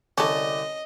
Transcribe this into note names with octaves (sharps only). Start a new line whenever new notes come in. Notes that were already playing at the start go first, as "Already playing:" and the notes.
C2 D3 C#4 A4 D5 D#5